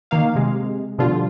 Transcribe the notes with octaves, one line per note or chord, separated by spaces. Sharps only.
D#3 A#3 F5
C3 G#3
B2 D3 F3 G3 F4